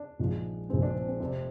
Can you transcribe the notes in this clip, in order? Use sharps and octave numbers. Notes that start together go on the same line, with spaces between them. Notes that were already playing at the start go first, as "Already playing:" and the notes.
Already playing: D4
A#1 G#2 F3 G#3
A#1 G#2 F3 G#3 C4
D4
C4
C4
F1 F2 C3 C4